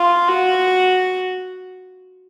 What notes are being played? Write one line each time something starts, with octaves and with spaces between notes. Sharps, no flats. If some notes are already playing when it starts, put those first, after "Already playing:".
Already playing: F4
F#4